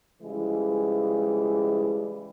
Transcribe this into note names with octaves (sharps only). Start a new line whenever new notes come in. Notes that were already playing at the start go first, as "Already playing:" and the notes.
C#3 E3 F3 G3 G#3 E4